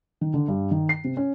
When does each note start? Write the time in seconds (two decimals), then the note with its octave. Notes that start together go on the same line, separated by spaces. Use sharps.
0.21 D#3
0.34 D3
0.48 G2
0.71 D#3
0.89 C7
1.04 C3
1.17 C#4